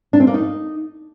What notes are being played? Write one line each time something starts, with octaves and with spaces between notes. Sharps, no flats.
D4
C4
A#3
D#4